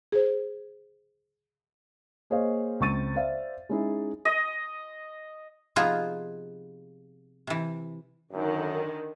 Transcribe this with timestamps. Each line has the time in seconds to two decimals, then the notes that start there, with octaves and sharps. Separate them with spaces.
0.12 G#4 C5
2.30 A#3 G#4 C5 C#5 D#5 F5
2.80 C#2 C4 C#6 A6 D#7
3.15 C5 D5 E5 F5
3.69 G#3 C#4 D#4 E4 G#4
4.25 D#5
5.76 C3 F3 B3 D#4 F4 G#4
7.47 C3 E3
8.32 F#2 D3 D#3